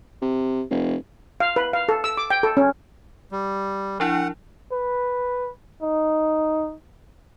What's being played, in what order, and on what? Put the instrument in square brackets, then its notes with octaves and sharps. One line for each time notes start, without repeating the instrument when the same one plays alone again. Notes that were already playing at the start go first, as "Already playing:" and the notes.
[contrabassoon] C3
F1
[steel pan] F5
B4
F5
A4
E6
D6
G5
A4
C#4
[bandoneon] G3
[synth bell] F3 D4 E4 [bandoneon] F#5
[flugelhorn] B4
D#4